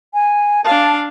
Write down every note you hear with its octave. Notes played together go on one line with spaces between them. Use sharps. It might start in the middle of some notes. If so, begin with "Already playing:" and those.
G#5
D4 F5 A5